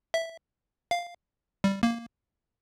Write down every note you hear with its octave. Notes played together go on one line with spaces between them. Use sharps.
E5
F5
G3
A#3